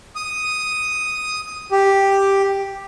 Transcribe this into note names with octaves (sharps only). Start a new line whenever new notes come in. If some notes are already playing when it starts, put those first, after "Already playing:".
D#6
G4